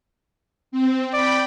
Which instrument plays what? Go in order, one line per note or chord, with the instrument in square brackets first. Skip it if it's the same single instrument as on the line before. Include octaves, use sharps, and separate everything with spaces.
[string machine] C4
[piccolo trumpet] D5 [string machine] G5 B5